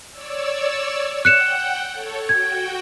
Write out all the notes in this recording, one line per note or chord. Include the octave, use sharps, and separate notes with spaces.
C#5 D5 E6
F#5 G5 F#6 C#7 E7
A4 C#5
F#4 G5 G#6